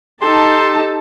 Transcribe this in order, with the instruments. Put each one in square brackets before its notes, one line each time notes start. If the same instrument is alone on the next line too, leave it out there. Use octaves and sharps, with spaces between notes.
[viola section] D#4 G4 A5 [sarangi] A4 [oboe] C6